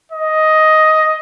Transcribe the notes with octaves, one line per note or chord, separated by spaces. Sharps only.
D#5